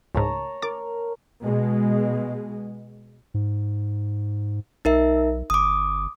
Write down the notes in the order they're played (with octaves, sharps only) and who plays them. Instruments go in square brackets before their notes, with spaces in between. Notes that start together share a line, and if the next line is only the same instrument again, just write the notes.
[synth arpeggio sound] C#2 G#2 [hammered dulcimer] C#5 A5 A#5
[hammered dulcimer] A#4 [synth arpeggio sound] D6 A6
[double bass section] B2 G#3
[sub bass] G#2
[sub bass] B1 [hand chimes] D#4 A#4 E5
[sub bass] G1 [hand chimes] D6 D#6